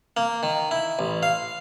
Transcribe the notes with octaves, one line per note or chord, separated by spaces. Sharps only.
A#3
D#3
E4
A1
F5